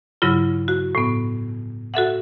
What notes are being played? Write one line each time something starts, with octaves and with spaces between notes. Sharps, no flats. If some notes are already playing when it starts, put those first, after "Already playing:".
G2 C#3 F#3 E4 F4
F#4
A2 B3
F#4 A4 E5 F#5